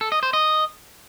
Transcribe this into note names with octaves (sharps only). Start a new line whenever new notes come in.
A4
D#5
C5
D#5